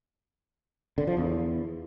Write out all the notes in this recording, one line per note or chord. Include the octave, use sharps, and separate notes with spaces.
D3
F3
E2